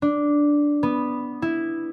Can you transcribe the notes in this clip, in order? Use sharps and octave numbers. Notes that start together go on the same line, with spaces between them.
D4
B3
E4